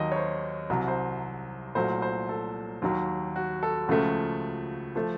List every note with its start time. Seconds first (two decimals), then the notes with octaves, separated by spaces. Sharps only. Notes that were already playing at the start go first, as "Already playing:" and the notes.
Already playing: D#2 D#3 F#3 D#5
0.12 C#5
0.16 C5
0.70 C2 C3 F#3
0.88 C5
1.75 C2 A#2 F#3 A3 C5
2.02 C5
2.29 A4
2.82 D#2 D#3 F#3
3.36 F#4
3.63 A4
3.88 C#2 C#3 F3 A3 F#4
4.96 F3 A3